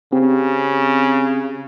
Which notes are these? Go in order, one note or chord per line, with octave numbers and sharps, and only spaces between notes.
C#3 C4 G4